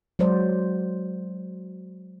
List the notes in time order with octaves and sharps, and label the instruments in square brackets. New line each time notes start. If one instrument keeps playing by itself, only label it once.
[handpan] F#3 G#3 F#4 C5 D5